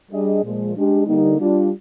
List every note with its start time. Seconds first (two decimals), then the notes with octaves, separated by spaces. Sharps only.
0.12 G3 D4 G#4 D#5
0.43 A#2 F3 G#3
0.75 G#3 D4 G4
1.07 D3 G3 A#3 D#4
1.38 G3 D4 F4